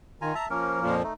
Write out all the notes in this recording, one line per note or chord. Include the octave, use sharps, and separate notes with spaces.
D#3 F4 G#5 A#5
E5 A5 A#5
F3 A#3 C#4 A#4
F2 A#2 F3
A3 D#4